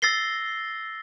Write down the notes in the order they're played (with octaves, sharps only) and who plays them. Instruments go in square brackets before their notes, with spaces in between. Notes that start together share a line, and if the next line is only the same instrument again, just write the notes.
[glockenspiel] E6 A6 A#6 C7 G7